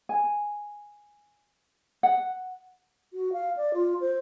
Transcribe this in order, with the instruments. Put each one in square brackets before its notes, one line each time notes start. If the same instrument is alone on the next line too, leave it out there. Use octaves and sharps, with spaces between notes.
[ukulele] G#5
F#5
[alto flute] F#4
F5
D5
F4
C5